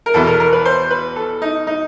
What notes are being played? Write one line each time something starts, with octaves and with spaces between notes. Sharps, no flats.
A#4
E2 B2 A4
A#4
A#4
B4
C5
B4
A4
D#4
D#4